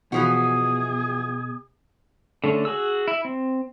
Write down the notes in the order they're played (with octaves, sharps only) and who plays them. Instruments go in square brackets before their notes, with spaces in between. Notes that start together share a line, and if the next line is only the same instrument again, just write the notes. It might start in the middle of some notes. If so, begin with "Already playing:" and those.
[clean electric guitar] B2 [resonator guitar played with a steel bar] E3 F3 F#4 [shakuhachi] G#4
[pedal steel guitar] D3 A3 C#4
F#4 G#4 E6
E4
C4